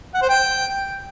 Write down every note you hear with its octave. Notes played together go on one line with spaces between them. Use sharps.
F#5
C5
G5